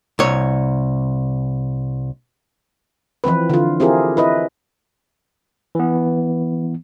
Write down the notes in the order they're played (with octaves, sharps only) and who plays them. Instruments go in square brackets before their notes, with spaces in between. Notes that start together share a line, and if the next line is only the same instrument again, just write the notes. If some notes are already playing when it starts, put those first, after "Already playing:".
[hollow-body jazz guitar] C2 C#5
[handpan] E3 F3 C4 B4
D3 F4
C4 E4 F4 G4 G#4 A#4
E4 B4 D#5
[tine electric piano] E3 B3